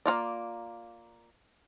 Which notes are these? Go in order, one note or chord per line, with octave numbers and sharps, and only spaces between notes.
A#3 C#4 F4 D5